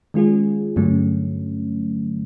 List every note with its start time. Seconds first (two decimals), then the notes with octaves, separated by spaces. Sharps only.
0.14 D#3 G#3 C#4 F4 G#4
0.76 G2 D3 F#3 A3 C#4